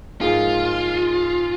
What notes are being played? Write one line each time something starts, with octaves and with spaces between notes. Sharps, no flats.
G#2 F3 A#3 D#4 F4 G#4